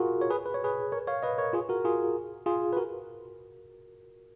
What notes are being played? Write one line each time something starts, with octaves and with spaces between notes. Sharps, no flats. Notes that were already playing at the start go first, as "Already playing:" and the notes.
Already playing: F4 F#4 G#4 A#4
C#5
G#4 B4
B4
C#5
G#4 B4
A#4 C#5
C#5 F5
B4 D#5
A#4 C#5
F4 G#4
F#4 A#4
F4 G#4
F4 G#4
B4
F#4 A#4